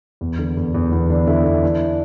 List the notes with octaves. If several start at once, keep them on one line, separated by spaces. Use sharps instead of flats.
E2
D3
E2
E2
E2 B3
D3 D4
D3 E4
E2 E4
E3 D4